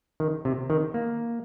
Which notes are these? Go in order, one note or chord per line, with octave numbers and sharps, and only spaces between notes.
D#3
C3
D#3
A#3